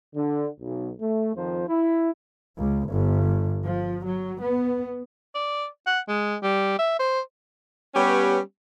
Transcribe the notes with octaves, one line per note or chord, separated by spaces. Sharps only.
D3
B1
A3
F2 D#3 F3 C5
E4
C#2
G1
F3
F#3
B3
D5
F#5
G#3
G3
E5
C5
G3 B3 C#4 G4 B4 C#5